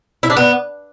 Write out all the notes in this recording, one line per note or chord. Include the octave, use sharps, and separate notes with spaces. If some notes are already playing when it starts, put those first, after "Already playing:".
E4
D4
B3